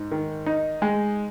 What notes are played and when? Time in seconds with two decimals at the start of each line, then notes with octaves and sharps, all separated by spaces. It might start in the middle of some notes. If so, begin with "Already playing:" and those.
Already playing: G#2
0.12 D#3
0.46 D#4
0.82 G#3